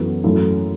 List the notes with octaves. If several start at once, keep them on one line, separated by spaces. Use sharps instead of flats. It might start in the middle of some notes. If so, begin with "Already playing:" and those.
Already playing: F#2 E3 B3 F#4 A4
F#2 E3 A3 E4 A4